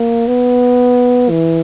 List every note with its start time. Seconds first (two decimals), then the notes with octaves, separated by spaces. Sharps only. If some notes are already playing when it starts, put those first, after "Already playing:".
Already playing: A#3
0.27 B3
1.30 E3